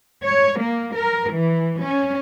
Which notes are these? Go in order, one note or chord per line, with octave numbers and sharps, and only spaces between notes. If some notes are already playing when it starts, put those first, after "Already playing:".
C#5
A#3
A#4
E3
C#4